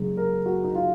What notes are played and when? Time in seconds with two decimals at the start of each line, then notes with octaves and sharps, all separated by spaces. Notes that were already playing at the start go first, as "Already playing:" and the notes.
Already playing: F#1 F#2 C#3 G#3
0.17 A#4
0.46 F#4
0.64 D#4
0.75 F4